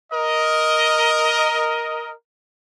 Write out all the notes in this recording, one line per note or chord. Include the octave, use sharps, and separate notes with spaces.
A#4 D#5